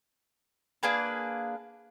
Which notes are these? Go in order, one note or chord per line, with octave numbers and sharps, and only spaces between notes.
A#3 D4 G#4 B4